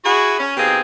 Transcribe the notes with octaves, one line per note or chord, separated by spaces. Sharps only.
E4 F#4 G#4
C#4
B2 A#3 C4 D#4 G4 G#4